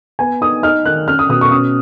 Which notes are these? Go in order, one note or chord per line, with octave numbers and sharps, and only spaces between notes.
B3 G#5
D#4 D#6
D#4 F6
D#3 F#6
C#4 F6
D#6
B2 D#6
C#6
C#4 D#6